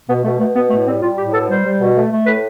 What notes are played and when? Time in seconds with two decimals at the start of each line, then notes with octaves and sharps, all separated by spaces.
0.08 B2 B3
0.23 B2 A3
0.39 B2 A3
0.54 B2 B3
0.70 A2 A3
0.86 G3 C4
1.01 G3 F4
1.17 A2 G4
1.32 B2 A4
1.49 G3 C5
1.64 G3
1.79 B2
1.95 A3
2.10 A3
2.26 A2 B4